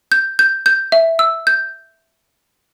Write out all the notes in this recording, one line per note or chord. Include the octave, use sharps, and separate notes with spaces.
G6
G6
G6
E5
E6
G6